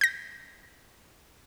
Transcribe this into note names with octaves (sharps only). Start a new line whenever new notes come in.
G6 A#6